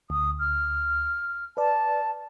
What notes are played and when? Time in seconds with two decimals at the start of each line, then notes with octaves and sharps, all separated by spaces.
0.10 D2 D#6
0.39 F6
1.57 B4 D5 A5